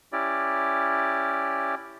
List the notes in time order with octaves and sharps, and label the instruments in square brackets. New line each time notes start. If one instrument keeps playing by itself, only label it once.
[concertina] C#4 E4 G4 D5